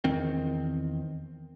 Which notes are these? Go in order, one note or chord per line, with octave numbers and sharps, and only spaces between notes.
E2 D#3 C4